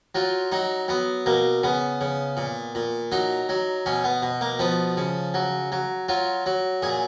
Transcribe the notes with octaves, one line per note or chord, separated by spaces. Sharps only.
F#3 F4
F#3 D#4
F#3 B3
B2 A#3
C#3 B3
C#3
A#2
A#2
F#3 D#4
F#3
B2 C#4
B3
B2
A#3
F3 B3
C#3
F#3
F#3
F#3 F4
F#3
A#2 G#4